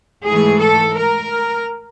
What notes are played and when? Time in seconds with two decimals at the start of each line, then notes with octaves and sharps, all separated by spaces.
0.25 G#2 E3 A3 G#4
0.60 A4
0.96 A#4